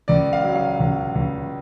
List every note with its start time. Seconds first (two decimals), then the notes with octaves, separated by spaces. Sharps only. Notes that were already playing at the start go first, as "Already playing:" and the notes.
0.08 C#2 D5
0.33 F5
0.44 F#3
0.56 F5
0.80 C#2
1.15 C#2